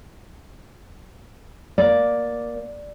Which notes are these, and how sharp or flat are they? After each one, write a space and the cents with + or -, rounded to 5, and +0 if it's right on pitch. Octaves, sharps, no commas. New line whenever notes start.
A#3 +15 D5 +0